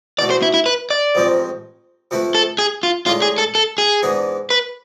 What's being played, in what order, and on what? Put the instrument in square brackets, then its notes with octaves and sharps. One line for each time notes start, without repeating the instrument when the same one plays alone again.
[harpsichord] E2 B2 A3 [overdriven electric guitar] D5
[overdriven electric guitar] C5
E4
E4
B4
D5
[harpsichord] A1 G#2 F3 G#3 C4
C3 F3 A3 E4 B4
[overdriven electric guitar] A4
G#4
F4
[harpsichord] A2 G#3 D4 [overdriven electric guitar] F4
[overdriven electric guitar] G#4
A4
A4
G#4
[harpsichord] G#2 E3 B3 D4 G#4
[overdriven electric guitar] B4